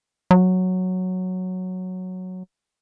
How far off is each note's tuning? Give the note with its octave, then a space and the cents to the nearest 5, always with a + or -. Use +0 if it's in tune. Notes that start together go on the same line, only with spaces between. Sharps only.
F#3 -5